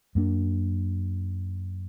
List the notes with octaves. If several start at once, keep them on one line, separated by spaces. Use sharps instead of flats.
F#2 F#3 A#3 D4